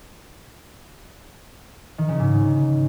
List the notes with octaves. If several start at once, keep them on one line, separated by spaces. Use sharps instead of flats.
D#3
C#3
G#2